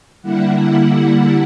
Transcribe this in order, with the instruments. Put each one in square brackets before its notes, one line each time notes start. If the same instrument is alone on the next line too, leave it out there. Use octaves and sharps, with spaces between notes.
[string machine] D3 G3 A#3 E4 F#5